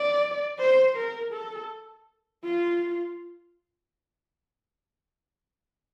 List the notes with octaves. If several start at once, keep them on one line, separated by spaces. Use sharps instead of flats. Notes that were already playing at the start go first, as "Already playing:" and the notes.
Already playing: D5
C5
A#4
A4
F4